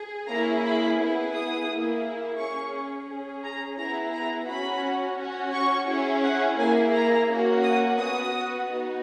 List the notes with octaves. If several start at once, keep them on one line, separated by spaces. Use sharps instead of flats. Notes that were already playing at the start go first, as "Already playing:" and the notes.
Already playing: G#4
A#3 C#4 E4 G#4 A#5
B5
B3 E4 G#4
D#6
A#3 E4 G#4
C#4 G#4 C#6
C#4 G#4
A#5
B3 E4 G#4 A#5
A#5
C#4 F#4 B5
C#4 F#4
C#6
C#4 E4 G#4
F#5
A#3 E4 G#4 G#5
A#5
A#3 C#4 F#4
D#6
B3 F#4 D#6
B3 D#4 F#4